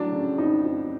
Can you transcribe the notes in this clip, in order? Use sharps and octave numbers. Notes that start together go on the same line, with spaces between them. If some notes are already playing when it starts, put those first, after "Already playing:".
Already playing: A2 F#3 D4
C#3
F2 D#4
F2